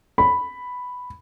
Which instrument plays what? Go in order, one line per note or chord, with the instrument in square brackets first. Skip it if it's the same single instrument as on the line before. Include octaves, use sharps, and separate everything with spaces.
[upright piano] B5